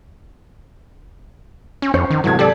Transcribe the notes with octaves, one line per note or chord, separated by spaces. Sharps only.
C#4
F2 C#4 C5 C#5
D#3
G#2 C3 E3 F#3 A4 G#6
G4 A4 D5